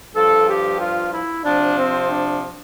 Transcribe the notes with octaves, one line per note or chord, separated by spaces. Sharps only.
G2 F3 A4
G4
F4
E4
C3 F3 D4
C4
D4